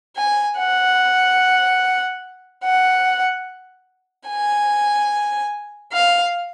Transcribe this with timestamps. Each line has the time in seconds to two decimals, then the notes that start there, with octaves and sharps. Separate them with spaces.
0.17 G#5
0.58 F#5
2.64 F#5
4.28 G#5
5.93 F5